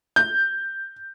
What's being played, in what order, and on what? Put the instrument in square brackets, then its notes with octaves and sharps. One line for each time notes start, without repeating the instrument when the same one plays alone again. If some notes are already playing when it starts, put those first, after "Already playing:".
[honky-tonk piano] G6